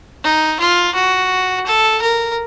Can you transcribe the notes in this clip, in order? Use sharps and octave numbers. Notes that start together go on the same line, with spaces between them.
D#4
F4
F#4
A4
A#4